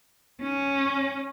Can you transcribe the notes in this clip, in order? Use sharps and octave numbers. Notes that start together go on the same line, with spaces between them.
C#4